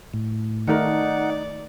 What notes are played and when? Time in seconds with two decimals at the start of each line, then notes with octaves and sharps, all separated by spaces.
0.14 A2
0.68 D#3 A3 D#4 A#4 D5 F#5